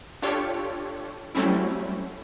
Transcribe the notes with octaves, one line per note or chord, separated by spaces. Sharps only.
D4 F4 G4 A4 C#5
F#3 G3 A3 C4 C#4 E4